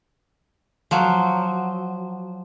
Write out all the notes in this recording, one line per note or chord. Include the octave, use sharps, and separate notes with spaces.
F3 F#3